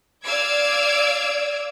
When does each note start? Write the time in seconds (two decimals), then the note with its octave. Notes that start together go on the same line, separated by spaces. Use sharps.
0.22 D5 F5 D6 E6 G#6 D7